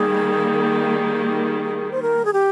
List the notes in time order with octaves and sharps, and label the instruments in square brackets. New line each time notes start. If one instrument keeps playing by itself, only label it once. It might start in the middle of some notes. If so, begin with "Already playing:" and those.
Already playing: [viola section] D#3 G3 A#3 [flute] G#4
[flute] C5
A#4
G#4
G4